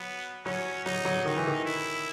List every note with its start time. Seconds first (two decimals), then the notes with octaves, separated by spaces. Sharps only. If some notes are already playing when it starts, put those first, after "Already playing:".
Already playing: F#3 B3
0.45 F#3 C#4
0.85 F#3 D#4
1.05 F#3
1.26 D#3 D#4
1.37 E3
1.47 D#3
1.65 E4